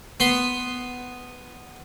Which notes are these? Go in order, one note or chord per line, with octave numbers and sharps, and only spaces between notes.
B3 C6